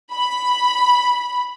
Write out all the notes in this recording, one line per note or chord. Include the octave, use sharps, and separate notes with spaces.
B5